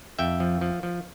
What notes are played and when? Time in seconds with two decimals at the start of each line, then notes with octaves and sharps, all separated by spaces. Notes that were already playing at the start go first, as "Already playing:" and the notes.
0.19 F2 E5 G5
0.40 F3
0.61 F3
0.83 F3